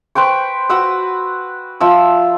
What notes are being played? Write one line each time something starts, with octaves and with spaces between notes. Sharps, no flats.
B4 C5 G5 C#6
F#4 B4 F#5 E6
F3 E5 E6